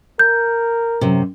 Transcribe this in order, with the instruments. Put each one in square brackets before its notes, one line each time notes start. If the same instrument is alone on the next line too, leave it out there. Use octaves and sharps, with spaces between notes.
[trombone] A#4 [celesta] G6
[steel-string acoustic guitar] F#2 C3